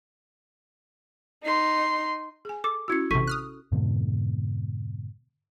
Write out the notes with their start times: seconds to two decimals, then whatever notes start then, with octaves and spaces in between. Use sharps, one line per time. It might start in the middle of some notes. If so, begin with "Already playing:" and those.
1.44 D#4 C6
2.45 G#4 G#5
2.64 A4 D6
2.88 C#4 E4 F#4 E6 G#6 C#7
3.11 A1 C3 A4 C#6 B6 D#7
3.27 D#6 F6 F#6
3.72 F2 G#2 B2 D3